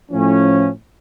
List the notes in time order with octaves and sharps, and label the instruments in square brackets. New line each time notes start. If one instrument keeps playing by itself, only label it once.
[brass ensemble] A2 F3 C#4